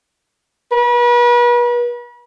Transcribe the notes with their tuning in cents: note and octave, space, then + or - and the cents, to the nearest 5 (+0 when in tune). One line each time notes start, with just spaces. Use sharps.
B4 -40